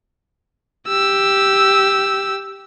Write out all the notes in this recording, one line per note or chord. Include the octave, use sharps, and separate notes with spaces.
G4 E6